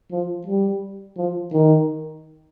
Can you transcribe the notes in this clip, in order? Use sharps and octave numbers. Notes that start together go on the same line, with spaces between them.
F3
G3
F3
D#3